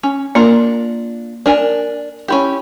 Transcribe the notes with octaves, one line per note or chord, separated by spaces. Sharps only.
C#4
A#3 D4 F4 A#4
D4 A#4 G#5
C#4 E4 G4